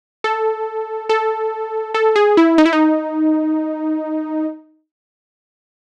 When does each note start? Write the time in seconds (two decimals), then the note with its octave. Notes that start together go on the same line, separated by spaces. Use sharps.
0.24 A4
1.09 A4
1.94 A4
2.16 G#4
2.37 E4
2.58 D#4
2.66 E4
2.73 D#4